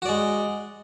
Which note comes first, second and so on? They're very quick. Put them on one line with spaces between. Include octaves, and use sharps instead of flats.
F#4 D5 G#3